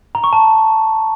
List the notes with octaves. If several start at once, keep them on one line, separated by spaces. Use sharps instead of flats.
A#5
C#6
A5